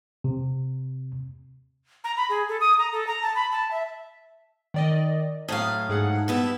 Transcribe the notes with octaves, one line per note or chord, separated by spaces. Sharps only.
C3
A#5
B5
G#4
A4
D#6
A#5
A4
A#5
A5
B5
A5
E5
D#3 D5 D#5
A2 F#3 F5 D#6
G#2 G#4 F#5
G2 B3 E4